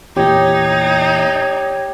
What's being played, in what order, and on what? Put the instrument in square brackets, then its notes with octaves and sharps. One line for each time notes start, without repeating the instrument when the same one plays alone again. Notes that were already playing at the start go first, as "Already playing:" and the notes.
[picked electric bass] E2 A#2 [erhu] D#4 [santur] G4 [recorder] C#5